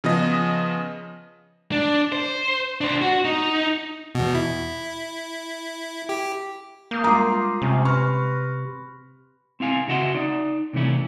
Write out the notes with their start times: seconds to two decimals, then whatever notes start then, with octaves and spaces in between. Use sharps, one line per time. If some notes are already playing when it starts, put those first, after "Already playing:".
0.04 C#3 F3 B3 D#5
1.72 D4
2.12 C5
2.81 D4 C5
3.02 F#4
3.25 D#4
4.15 E2 B2
4.35 E4
6.09 G4
6.91 A#3 D#6 G6
7.04 G3 G#3 F4 A#5 D6 D#6 C7
7.62 C3 C#4
7.85 B4 C6 C#6 F6 A#6
9.60 C4 E4 F5 G#5
9.88 C#3 F#4 D#5 E5 F#5 C6
10.15 D#4 D5
10.73 C3 E3 A3 C#4 E4